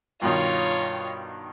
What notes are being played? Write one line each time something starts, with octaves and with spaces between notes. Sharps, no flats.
G2 B2 D#3 F4 C#5